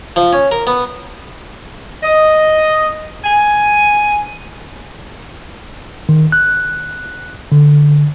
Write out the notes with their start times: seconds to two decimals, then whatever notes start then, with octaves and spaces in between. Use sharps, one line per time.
0.16 F3
0.33 C#4
0.52 A#4
0.67 B3
2.03 D#5
3.24 G#5
6.09 D#3
6.32 F#6
7.52 D3